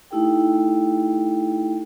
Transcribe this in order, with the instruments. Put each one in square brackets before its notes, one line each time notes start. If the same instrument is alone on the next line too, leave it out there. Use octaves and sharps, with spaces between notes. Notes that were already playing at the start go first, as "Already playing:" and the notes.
[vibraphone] A3 D#4 E4 G4 A4 G5